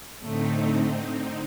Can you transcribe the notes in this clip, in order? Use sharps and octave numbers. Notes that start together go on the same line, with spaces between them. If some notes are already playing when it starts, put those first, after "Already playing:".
A2 D3 A3 C4 D#4